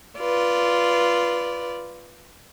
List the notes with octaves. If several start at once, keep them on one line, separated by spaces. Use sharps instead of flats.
F4 B4 D5